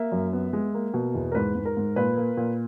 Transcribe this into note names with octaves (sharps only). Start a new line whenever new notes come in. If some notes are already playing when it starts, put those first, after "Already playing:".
Already playing: A#3 E5
F#2
B3
G#3
A#3
B2
E2
A#4
G#2 B4
G#2
A#4
G#2
A#2 B4
A#3
A#2